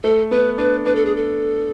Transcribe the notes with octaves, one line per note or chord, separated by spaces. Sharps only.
A3 A4
B3 B4
D4 B4
D4 B4
A4
G#4
A4